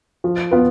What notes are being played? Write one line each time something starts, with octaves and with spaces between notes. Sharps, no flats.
F3
B3 F4 B4